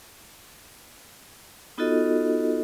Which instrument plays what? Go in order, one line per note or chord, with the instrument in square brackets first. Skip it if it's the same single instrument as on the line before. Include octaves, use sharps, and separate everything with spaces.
[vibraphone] B3 D#4 F4 F#4 A4 D#5